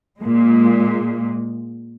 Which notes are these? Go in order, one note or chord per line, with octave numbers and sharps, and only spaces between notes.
A#2 G#3